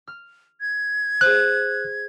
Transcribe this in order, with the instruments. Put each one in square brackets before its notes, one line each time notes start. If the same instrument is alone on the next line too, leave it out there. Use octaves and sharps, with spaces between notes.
[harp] F6
[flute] G#6
[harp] G#4 C5 [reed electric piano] F#6